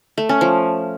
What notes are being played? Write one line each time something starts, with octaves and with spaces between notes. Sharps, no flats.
A3
C#4
F3